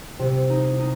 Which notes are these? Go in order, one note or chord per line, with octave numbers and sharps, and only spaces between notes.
C3
D#4
D#4